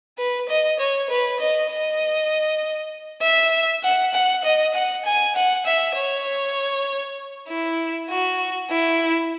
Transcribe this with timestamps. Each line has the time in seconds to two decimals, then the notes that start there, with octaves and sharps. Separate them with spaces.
0.18 B4
0.48 D#5
0.79 C#5
1.09 B4
1.39 D#5
1.70 D#5
3.22 E5
3.83 F#5
4.13 F#5
4.44 D#5
4.74 F#5
5.05 G#5
5.35 F#5
5.66 E5
5.96 C#5
7.48 E4
8.09 F#4
8.70 E4